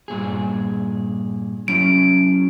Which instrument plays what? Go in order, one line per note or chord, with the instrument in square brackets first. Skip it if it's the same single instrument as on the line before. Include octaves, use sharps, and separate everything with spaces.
[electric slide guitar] G2 A#2 G#4
[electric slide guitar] F#3 C#4 E4 [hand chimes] D7